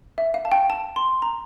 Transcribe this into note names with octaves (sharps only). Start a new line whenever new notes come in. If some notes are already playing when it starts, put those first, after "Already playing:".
E5
F5
A5
G5
A5
C6
A#5